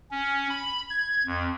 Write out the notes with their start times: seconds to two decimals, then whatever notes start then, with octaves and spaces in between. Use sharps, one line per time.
0.11 C#4
0.50 B5
0.90 G#6
1.27 F2